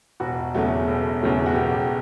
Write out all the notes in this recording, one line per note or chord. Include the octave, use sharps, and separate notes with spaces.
E1 F#4
E2 C#3 F#3 A3
E1
E2 C#3 F#3 A3
F#4
E1 G4